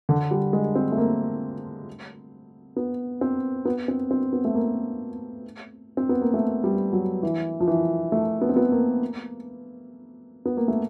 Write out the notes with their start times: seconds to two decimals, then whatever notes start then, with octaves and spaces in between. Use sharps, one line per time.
0.09 D3
0.31 G3
0.53 G#3
0.75 C4
0.92 A3
0.98 A#3
2.76 B3
3.21 C4
3.65 B3
3.88 C4
4.11 C4
4.33 B3
4.45 A3
4.55 A#3
5.97 C4
6.09 B3
6.22 A#3
6.34 A3
6.64 G3
6.93 F#3
7.23 E3
7.60 F3
7.67 E3
8.12 A3
8.41 B3
8.49 C4
8.56 B3
8.72 A#3
10.45 B3
10.57 A#3
10.68 A3